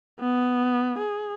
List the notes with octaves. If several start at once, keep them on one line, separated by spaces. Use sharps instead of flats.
B3
G#4